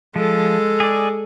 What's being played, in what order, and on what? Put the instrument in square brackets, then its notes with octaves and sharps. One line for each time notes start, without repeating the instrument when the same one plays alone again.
[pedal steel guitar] F3 [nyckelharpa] G#3 A4
[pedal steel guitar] G#4 D5